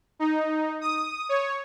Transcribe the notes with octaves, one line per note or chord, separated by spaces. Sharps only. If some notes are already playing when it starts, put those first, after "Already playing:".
D#4
D#6
C#5